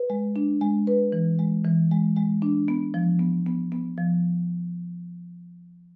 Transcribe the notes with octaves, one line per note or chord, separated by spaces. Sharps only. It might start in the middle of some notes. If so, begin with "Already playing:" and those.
Already playing: B4
G#3
D4
G#3
B4
E3
G#3
E3
G#3
G#3
D4
B3
F3
B3
B3
B3
F3